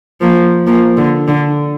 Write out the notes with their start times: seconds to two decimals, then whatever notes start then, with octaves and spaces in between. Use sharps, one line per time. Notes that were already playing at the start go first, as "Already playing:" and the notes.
0.21 F3 A#3
0.67 F3 A#3
0.97 D3
1.28 D3